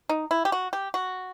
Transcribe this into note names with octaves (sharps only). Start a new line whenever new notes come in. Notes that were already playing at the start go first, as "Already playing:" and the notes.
D#4
E4
G4
F#4
G4
F#4